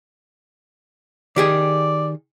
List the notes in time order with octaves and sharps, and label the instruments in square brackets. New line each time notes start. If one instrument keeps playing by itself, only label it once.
[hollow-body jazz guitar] D#3 G4 G#4 [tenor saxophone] D5